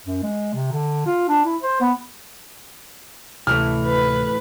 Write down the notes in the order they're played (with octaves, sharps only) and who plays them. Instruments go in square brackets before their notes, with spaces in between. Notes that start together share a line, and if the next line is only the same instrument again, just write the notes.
[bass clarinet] F#2
G#3
C3
D3
F4
D4
E4
C5
B3
[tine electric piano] D2 C3 [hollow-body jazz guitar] A2 E3 A3 [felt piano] F6
[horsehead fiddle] B4